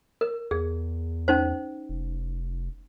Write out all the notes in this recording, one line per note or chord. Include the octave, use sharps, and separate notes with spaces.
A#4
E2 G#4
C#4 D#4 C5
F1